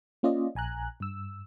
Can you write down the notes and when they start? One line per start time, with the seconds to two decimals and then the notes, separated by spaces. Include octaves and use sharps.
0.23 A#3 C#4 F4 D5 D#5
0.55 A#1 G#5 A#5 F#6
1.00 G2 E6